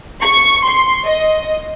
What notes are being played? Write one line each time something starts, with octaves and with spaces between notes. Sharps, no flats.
C#6
C6
D#5